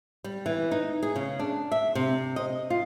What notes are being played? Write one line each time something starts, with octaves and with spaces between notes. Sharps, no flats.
G3
E3
D#4
G#4
C#3
D4
E5
C3
D#5
F4